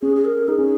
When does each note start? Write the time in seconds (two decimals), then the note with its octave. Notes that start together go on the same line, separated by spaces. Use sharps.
0.02 C#4 G#4
0.16 G#4
0.25 A#4
0.48 D#4 G#4
0.58 C#4